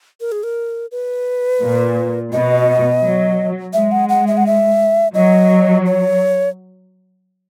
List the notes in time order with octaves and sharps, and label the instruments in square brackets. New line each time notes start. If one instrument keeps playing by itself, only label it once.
[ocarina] A#4
G#4
A#4
B4
[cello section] A#2
[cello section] B2 [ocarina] D#5
[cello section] F#3
[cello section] G#3 [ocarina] E5
[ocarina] F#5
F#5
E5
F#5
E5
[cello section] F#3 [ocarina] D#5
[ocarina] C#5